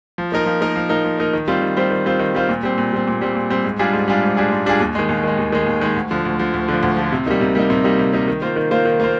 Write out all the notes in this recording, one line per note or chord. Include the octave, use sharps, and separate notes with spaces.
F3
A#3 D#4 A#4
F3
A#3 D#4 A#4
F3
A#3 D#4 A#4
F3
A#3 D#4 A#4
D#3
G3 C4 F4 C5
D#3
G3 C4 F4 C5
D#3
G3 C4 F4 C5
D#3
G3 C4 F4 C5
A#2
G3 C4
A#2
G3 C4
A#2
G3 C4
A#2
G3 C4
G#2
G3 D4 F4 G#4
G#2
G3 D4 F4 G#4
G#2
G3 D4 F4 G#4
G#2
G3 D4 F4 G#4
D#2
D#3 G#3
D#2
D#3 G#3
D#2
D#3 G#3
D#2
D#3 G#3
D2
D3 F3
D2
D3 F3
D2
D3 F3
D2
D3 F3
C3
G3 A#3 D#4
C3
G3 A#3 D#4
C3
G3 A#3 D#4
C3
G3 A#3 D#4
D#3
A#3 F4 C5
D#3
A#3 F4 C5
D#3
A#3 F4 C5